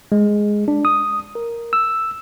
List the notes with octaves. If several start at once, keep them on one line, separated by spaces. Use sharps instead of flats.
G#3
D4
D#6
A#4
E6